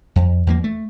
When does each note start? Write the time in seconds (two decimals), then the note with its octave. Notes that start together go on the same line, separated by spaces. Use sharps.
0.16 F2
0.47 E2 F3 F#3 A#3
0.64 A3